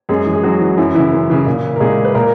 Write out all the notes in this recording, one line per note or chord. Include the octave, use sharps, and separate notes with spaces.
F#2 G#3 G#4
E3
G#4
F#2 F#3 F#4
E3
F#2 E3 E4
C#3 E3 E4
F#2
C#3 E3
A#2
A#4
A#2 G#3 G#4
B4
A#2 A#3 A#4